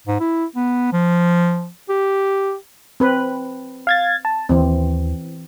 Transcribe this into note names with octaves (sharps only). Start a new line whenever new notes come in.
G#2
E4
B3
F3
G4
C4 B4
F5 G#6 A6
A5
D#2 E3 C4